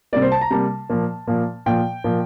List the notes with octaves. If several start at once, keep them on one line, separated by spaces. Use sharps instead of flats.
C3 G3 A#3 D5
C5
A5
A#5
C3 G3 A#3 A5
A#2 F3 A#3
A#2 F3 A#3
A#2 F3 A#3 G5
A#2 F3 A#3